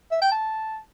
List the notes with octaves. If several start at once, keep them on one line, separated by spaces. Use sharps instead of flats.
E5
G5
A5